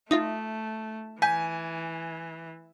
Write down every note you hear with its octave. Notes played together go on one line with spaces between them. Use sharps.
A3 D#4 F4 E5 D#6
E3 G#5 G6 B6